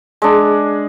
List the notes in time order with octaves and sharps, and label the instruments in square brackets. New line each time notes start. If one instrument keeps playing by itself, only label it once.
[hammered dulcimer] G#3 D4